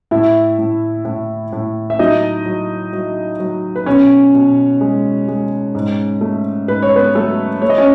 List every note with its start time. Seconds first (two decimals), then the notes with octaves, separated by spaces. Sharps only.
0.11 A2 E4 E5
0.59 A2
1.05 A2
1.52 A2
1.90 E5
1.99 F#3 D#4 D#5
2.46 F#3
2.93 F#3
3.40 F#3
3.76 B4
3.86 B2 C#4 C#5
4.34 B2
4.81 G#3
5.28 G#3
5.75 G#2
6.21 A3
6.68 G#2 B4
6.82 C#5
6.96 B3 B4
7.15 F#3 A3 A4
7.62 A3 C#5
7.70 D#5
7.77 C#4 C#5